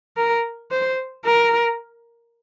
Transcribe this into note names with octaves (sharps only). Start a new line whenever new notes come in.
A#4
C5
A#4